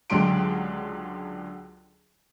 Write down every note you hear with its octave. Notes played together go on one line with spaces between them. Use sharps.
C#2 D3 F#3 G4 C6 D7